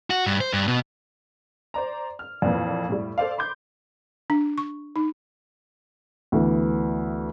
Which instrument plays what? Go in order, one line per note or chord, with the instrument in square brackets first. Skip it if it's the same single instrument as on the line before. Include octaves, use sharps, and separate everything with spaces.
[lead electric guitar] F#4
G2
C5
G2
B2
[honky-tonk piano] C5 D5 A#5
F6
F2 A#2 E3
A2 G3
A4 C5 D5 F5
B5 C6 D6 G6
[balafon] D4
C#6
D#4
[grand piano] D2 E3 B3